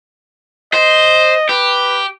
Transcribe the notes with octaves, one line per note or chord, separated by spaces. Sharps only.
C5 D#5
G4 B4